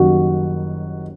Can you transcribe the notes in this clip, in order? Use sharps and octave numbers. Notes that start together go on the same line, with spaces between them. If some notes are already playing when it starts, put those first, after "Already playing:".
Already playing: F#1 F#2 D#3 G3 F#4